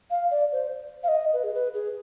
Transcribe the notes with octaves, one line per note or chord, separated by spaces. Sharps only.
F5
D5
C5
F5
D#5
B4
G#4
B4
G#4